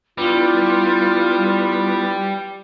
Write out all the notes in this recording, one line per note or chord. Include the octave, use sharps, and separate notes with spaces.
G3 B3 D4 E4 F4 B4